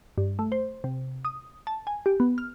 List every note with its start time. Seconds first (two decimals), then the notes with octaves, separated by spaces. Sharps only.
0.18 G2
0.39 A3
0.52 C5
0.84 C3
1.25 D#6
1.67 A5
1.87 G#5
2.06 G4
2.20 B3
2.38 F6